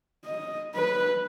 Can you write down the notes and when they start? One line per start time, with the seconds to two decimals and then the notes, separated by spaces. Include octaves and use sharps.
0.25 D#5
0.75 B4